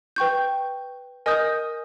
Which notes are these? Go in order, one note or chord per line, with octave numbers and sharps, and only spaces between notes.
B4 G5 C#6 G6
A#4 D#5 G#5 D#6 G6